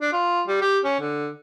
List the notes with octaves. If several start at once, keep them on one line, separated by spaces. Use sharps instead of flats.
D4
F4
G3
G4
C#4
D3